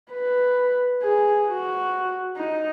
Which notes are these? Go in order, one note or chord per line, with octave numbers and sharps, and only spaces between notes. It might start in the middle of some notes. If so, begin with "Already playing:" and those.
B4
G#4
F#4
D#4